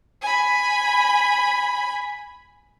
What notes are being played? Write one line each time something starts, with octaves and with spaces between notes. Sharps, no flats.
G#5 B5